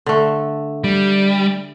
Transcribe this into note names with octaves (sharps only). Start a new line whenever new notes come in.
D3 A3
G3